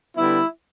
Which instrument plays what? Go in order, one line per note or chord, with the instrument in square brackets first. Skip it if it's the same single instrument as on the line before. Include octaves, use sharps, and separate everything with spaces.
[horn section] D3 G3 B3 E4